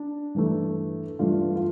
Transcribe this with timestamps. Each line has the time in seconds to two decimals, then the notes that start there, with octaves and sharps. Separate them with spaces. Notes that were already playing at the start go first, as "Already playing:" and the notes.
Already playing: D4
0.35 G2 E3 A3
1.19 G2 E3 A3 D4 F4
1.56 F4